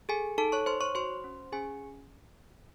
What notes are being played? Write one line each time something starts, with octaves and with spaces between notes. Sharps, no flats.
G#4 A4 G#5
D#4 A4 A5
C#5 C#6
D#4 C5 C6
C#5 C#6
F#4 C5 C6
C#4
C#4 G#4 G#5